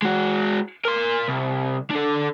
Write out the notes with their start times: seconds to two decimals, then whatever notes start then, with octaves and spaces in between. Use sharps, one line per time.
0.02 G#3 F#4
0.85 A#4 C6
1.28 C2
1.90 D4 A4